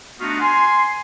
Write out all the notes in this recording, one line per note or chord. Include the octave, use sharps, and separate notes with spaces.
A3 B3 D4 D#4 F4 F#4
G#5 C6